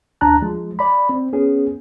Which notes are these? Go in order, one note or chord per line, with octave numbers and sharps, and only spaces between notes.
D#2 D4 A5 A#5 F#6
F3 G#3
D5 B5
C4
B3 C#4 G#4